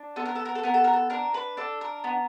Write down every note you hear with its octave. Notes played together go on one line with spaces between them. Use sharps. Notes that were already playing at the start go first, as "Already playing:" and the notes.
Already playing: D4
B3 A4
A#4
A4
A#4
A4
B3 A#4
A4
A#4
A4
D4 A#4
B4
D4 A4
A#4
B3